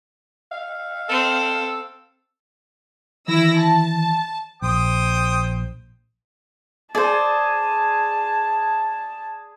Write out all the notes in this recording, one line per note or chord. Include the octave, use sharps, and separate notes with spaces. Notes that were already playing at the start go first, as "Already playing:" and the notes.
F5
C4 A4
D#3 E3 E4 E6 A#6
A5
A#1 C5 G5 D#6
G#4 C5 D5 A5